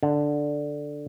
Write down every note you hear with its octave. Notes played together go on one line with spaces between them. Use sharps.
D3